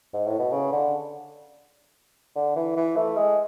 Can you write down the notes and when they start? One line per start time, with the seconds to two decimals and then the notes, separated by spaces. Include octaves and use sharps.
0.13 G#2
0.27 A2
0.39 B2
0.52 C#3
0.72 D3
2.35 D3
2.56 E3
2.76 E3
2.96 A3
3.17 G#3